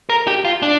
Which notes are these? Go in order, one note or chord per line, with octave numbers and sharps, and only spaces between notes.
A#4
G4
F4
D4